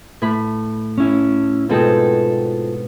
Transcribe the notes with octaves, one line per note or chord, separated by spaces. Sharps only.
A2 B5
C#4 E4
G#2 B2 C4 F4 A4